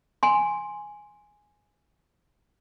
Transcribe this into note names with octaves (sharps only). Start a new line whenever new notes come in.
G#5 C6